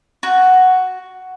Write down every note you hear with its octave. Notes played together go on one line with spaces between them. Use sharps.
F#4